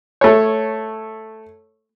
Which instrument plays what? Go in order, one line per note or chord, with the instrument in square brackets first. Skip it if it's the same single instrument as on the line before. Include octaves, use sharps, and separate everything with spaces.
[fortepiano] A3 C#5